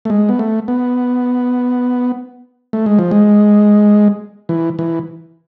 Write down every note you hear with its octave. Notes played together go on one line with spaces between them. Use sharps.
A3
G#3
B3
A3
B3
A3
G#3
F3
G#3
E3
E3